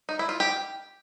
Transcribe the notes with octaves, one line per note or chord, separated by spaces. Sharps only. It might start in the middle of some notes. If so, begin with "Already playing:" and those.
D#4
E4
F4
G4